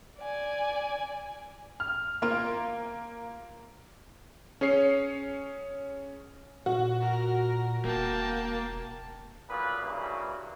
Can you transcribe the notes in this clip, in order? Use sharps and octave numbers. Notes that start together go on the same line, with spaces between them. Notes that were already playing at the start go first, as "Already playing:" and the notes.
D5 G#5
F6
A#3 C4 F4
C#4 G#4 C#5 C7
A#2 F#4
A#4
E1 A#3 G5 A5
B1 A#2 B3 F4 B4
G2 C#3 E3 F#3 A#3